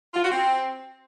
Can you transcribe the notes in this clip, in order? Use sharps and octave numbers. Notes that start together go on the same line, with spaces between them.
F4
F#4
C4